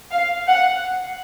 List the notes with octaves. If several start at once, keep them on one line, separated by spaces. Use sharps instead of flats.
F5
F#5